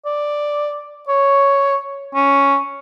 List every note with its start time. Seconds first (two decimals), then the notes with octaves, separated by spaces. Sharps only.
0.06 D5
1.08 C#5
2.15 C#4